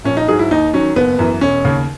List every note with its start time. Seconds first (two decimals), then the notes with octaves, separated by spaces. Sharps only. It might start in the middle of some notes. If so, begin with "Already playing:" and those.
0.05 A#1 C#4
0.17 D#4
0.28 G#2 F#3 G#4
0.39 E4
0.51 D#2 D#4
0.74 D#3 F#3 C#4
0.95 F#1 B3
1.19 F#2 E3
1.41 E1 C#4
1.64 D#2 C#3